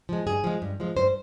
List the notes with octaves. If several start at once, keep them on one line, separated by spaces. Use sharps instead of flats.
F3 G#3
G2 G#4
F3 G#3
G2
F3 G#3
G2 C5